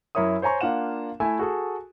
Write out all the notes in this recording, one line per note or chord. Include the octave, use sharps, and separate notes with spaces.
F#2 E4 A#4 C#5 E5 D#6
C5 C#5 G#5 A#5 C#6
A#3 D4 F4 F#5 E7
A3 E4 E5 G#5
F#4 G#4 A4